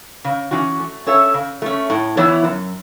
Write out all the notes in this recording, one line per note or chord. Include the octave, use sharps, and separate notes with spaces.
C#3
E3 C#4 F#4
A3
C#4 A4 C#5 E5
C#3
A3 C#4
A2
E3 B3 E4 C#5
F#2